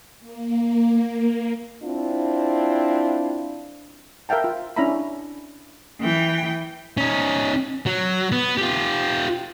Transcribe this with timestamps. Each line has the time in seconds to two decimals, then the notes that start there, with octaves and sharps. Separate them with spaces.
0.19 A#3
1.83 C4 D4 E4 F4
4.29 A#4 E5 F5 G5 A5
4.44 F4
4.76 C#4 D4 E4 E5 A#5 B5
6.01 E3 G5
6.97 C#4 D#4
7.86 F#3
8.32 B3
8.58 F4 G4